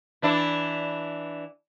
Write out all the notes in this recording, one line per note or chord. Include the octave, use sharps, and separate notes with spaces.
E3 D4 E4